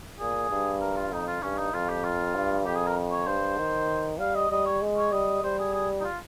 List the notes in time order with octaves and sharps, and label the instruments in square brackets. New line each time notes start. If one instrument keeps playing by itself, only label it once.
[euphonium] A#2 [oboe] G#4
[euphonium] G2
[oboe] A#4
F4
[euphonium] F2 [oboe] D#4
[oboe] F4
[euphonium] G2 [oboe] C#4
[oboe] D#4
[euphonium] F2 [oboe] F4
[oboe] G4
F4
[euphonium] G2
[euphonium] F2 [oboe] G4
[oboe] G#4
A#4
C#5
[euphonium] G2 [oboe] C5
[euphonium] D#3
[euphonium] G3 [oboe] F5
[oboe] D#5
[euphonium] G3 [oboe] D#5
[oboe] C#5
[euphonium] G#3
[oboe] C#5
[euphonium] G3 [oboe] D#5
[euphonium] G3 [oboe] C5
[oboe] G#4
G#4
D#4
F4